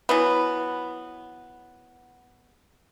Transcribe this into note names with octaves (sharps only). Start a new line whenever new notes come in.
E3 F#3 B3